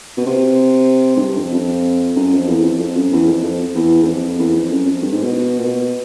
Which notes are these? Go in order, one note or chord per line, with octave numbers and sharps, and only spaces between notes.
B2
C3
G#2
G2
F2
F2
F#2
F2
E2
F2
F2
F#2
E2
F2
F2
E2
E2
F2
E2
F2
F#2
F2
G2
G#2
B2
A#2
B2